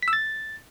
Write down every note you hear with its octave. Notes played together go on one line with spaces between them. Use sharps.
B6
E6
A6